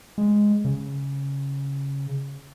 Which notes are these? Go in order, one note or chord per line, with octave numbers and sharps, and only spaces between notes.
G#3
C#3